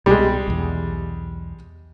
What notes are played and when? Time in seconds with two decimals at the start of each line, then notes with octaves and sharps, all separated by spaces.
0.06 C2 B2 G3 G#3
0.48 B1 E2